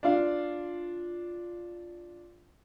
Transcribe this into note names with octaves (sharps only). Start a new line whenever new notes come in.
D4 F4 F5